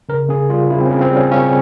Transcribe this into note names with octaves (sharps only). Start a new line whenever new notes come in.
C#3 A#4
C#3 G#4
G3 F4
C#3 E4
C4
C#4
C#3
C4
G3 C#4
C#3 C#4